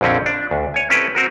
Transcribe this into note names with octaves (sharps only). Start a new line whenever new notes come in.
A#1 F2 D3 C4 C#4
D4
D2
C#5 G#5
C4 C#4 E4 G4 A4 B4
C4 F#4 A#4